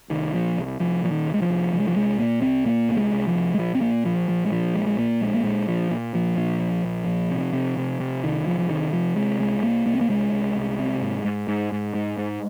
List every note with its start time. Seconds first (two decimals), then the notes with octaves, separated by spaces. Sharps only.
0.10 C2 D#3
0.34 A#2 F3
0.56 C2
0.80 C2 F3
1.02 A#2 F3
1.11 D#3
1.26 C2
1.34 G#3
1.42 F3
1.49 C2
1.73 C2 F3
1.80 G#3
1.88 F3
1.96 C2 G#3
2.19 A#2 A#3
2.42 C2 C4
2.66 A#2 A#3
2.89 C2 A#3
2.97 G#3
3.12 C2
3.28 F3
3.35 C2
3.54 G#3
3.58 A#1 F3
3.75 C4
3.81 A#2 A#3
4.05 A#1 F3
4.28 A#1 F3
4.45 G#3
4.51 A#2 F3
4.74 A#1 G#3
4.87 G#3
4.98 A#2 A#3
5.21 A#1 G#3
5.34 A#3
5.44 A#2 G#3
5.68 A#2 F3
5.91 A#2
6.14 A#2 F3
6.37 A#2
6.60 A#1
6.84 A#1
7.06 A#1
7.30 C3
7.53 C3
7.77 C3
8.00 C3
8.23 C2 D#3
8.47 C2 F3
8.58 F3
8.69 C3 D#3
8.92 C3 F3
9.16 C3 G#3
9.39 C2 G#3
9.62 C2 A#3
9.86 C2 A#3
9.94 C4
10.01 A#3
10.09 C2 G#3
10.32 C2
10.56 C2
10.79 C3
11.02 G#2
11.25 G#2
11.48 G#2
11.72 G#2
11.94 G#2
12.18 G#2